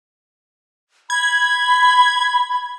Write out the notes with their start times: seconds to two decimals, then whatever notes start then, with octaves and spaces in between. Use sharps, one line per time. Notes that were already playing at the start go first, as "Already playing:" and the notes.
1.10 B5 G#6